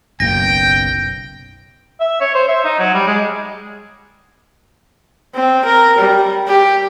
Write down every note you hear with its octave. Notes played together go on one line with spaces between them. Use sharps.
F#1 B1 A#3 G5 A#6
E5
C#5
C5
E5
D#4
F#3
G3
G#3
C4
A#4
G3
G4